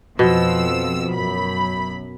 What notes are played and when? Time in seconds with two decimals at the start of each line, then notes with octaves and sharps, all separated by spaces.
0.19 F2 B2 F3 E6
1.14 F#2 B5